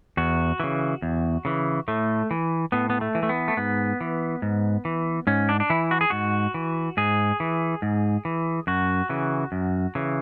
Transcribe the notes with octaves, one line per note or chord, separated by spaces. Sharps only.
E2 F#4
C#3 E3
E2
C#3 E3
A2 A3
E3
A2 B3
B3
A3
E3
A3
B3
A3
G#2 B3
E3
G#2
E3
G#2 C#4
D4
D4
E3 E4
F#4
G#4
G#2 F#4
E3
G#2 G#4
E3
G#2
E3
F#2 F#4
C#3 E3
F#2
C#3 E3